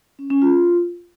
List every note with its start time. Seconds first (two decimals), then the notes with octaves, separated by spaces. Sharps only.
0.19 C#4
0.30 C#4
0.42 F4